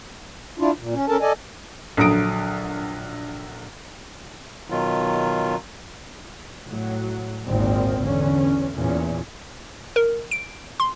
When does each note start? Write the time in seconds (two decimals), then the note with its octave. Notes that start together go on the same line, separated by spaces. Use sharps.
0.59 D4 E4 F4
0.78 A#2
0.94 C#4
1.08 C#4 A4 A#4 A5
1.21 A4 D5 D#5 G#5
1.97 A#1 D3 F#3 D#6 D7
4.70 B2 D#3 F#3 F4
6.67 A2 F#3
7.46 G#1 D2 A#2 D#3 C4
8.02 E2 D3 C#4
8.74 E2 A#2 C#4
9.96 A#4
10.31 D7
10.80 C6